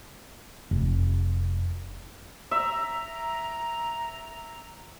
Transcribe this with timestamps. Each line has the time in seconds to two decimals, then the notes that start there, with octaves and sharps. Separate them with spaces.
0.71 F1
2.51 E5 A#5